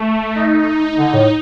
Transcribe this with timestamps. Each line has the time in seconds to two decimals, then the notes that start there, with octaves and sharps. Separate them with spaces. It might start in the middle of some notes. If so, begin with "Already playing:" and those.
Already playing: A3
0.35 D#4
0.98 D3 D#4
1.14 A2